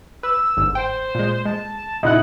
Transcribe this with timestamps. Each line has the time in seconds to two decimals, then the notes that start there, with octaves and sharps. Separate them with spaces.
0.23 B4 E6
0.57 G1 G#2
0.75 C5 G5
1.15 A#2 G#3
1.45 G#3 A5
2.03 A#2 C#3 D#4 E4 F#5 F#6